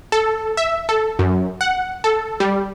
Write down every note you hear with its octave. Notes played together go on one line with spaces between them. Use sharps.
A4
E5
A4
F#2
F#5
A4
G3